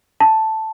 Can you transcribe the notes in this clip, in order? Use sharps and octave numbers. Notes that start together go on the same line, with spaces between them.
A5